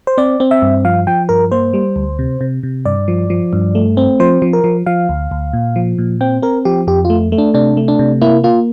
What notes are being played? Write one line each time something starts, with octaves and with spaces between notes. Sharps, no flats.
C5
C4 D5
C4
E5
G2
F3 F5
F3 G5
G2 A#4
A#3 C5
G3
D2
C3
C3
C3
G2 D5
F3
F3
G2
A3
C4
F3 C5
F3
A#4
F3
F3 F5
D2
D2
A#2
F3
A#2
C4 G5
C4 A#4
F3 G4
F2 G4
F4
A3
A3
D4
C3 D4
A3
D4
C3
A#3 E4
A#3 F4